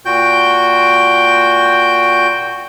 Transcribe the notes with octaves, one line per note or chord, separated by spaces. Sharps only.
A#2 F#4 G5 G6